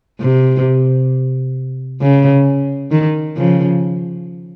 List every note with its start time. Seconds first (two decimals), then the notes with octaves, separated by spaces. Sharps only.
0.20 C3
2.01 C#3
2.91 D#3
3.36 C#3 F3